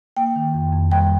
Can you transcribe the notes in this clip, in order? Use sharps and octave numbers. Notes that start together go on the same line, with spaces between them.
A#3 G5
D#3
F2
F2
G3 G5